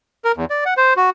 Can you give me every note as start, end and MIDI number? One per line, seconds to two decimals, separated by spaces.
0.25 0.32 70
0.37 0.45 40
0.50 0.64 74
0.65 0.74 78
0.77 0.94 72
0.97 1.10 66